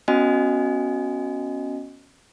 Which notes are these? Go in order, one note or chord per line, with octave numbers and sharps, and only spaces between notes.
B3 C#4 F#4 D#5 G#5